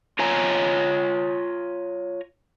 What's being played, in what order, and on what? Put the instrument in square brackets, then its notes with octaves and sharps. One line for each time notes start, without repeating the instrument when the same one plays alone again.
[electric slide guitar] F4 C#5 G#5 A#5